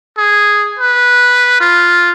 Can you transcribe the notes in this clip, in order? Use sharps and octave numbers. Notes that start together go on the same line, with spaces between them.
G#4
B4
F4